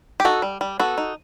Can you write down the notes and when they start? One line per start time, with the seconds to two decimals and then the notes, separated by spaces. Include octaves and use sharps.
0.20 G4
0.25 D#4 F#4 A4
0.42 G3
0.61 G3
0.79 B3 F#4 A4
0.98 D#4